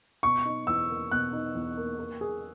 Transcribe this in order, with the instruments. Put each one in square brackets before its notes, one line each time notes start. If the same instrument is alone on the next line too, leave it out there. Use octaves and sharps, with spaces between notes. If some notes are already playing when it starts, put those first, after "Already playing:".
[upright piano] B2 [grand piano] C#6
[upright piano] D#4
[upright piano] E2 [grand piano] E6
[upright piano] A#3
[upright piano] B2 [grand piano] F#6
[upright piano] D#4
E2
A#3
A#3
G#4